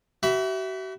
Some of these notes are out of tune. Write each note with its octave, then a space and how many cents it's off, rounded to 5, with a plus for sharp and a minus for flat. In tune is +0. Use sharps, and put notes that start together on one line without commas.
F#4 +45 E5 +0 B5 +0